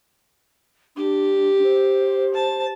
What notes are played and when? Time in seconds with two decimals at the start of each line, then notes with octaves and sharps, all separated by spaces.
0.97 D4 G4
1.64 C5
2.34 A5